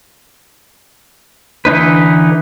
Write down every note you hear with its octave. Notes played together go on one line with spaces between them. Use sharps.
D3 E3 D#4 B4